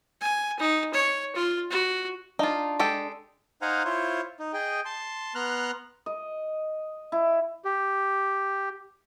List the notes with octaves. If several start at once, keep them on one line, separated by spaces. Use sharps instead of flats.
G#5
D#4
C#5
F4
F#4
D4 D#4 F4
G#3 G4 A4
D#4 C5 F5 F#5 G#5 A#5
E4 F4 C5 C#5
D#4
G#4 D#5 G5
A5 C6
B3 A#5 C6 F6 F#6
D#5
E4
G4